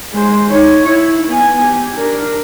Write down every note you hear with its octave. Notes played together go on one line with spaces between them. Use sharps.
G#3 C5
D#4 C#5
E4
B3 G#5
G4
D4 A#4